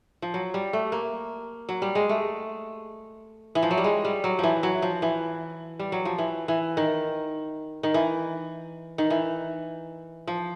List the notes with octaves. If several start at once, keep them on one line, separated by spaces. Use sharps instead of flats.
F3
F#3
G3
A3
A#3
F#3
G3
G#3
A3
E3
F3
F#3
G3
G#3
G3
F#3
E3 F3
F#3
F3
E3
G3
F#3
F3
E3
E3
D#3
D#3
E3
D#3
E3
F3